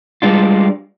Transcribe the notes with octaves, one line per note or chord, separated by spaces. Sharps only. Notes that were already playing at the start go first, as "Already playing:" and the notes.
G3 G#3 D4 F4